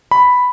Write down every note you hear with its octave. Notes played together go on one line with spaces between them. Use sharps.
B5